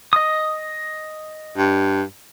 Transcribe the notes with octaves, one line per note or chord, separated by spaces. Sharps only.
D#5 D#6
G2